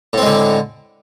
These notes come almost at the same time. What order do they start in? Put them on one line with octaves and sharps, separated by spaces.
A2 C4 G#3 D3